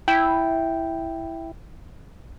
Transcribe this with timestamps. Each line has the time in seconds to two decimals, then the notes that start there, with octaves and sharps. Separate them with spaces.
0.08 E4 G5